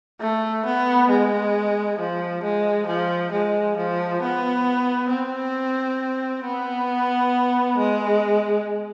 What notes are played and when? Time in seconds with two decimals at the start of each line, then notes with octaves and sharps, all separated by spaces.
0.20 A3
0.65 B3
1.09 G#3
1.99 F3
2.43 G#3
2.87 F3
3.31 G#3
3.76 F3
4.22 B3
5.10 C4
6.44 B3
7.78 G#3